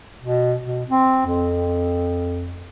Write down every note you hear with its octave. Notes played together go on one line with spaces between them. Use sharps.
B2
B2
C4
F2